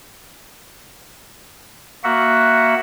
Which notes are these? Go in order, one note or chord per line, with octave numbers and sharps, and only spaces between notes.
A#3 F#4 E5 F#5